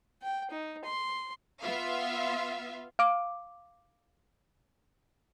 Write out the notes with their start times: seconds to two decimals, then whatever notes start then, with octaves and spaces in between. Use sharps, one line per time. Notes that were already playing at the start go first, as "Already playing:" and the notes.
0.22 G5
0.51 D#4
0.85 C6
1.62 B3 F4 E5 F5
2.99 F5 D6